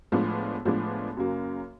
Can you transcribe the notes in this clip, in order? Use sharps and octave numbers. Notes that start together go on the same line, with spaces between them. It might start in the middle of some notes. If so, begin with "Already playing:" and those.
A2 F3 G#3 B3 D4
A2 F3 G#3 B3 D4
F#2 C#3 F#3 A#3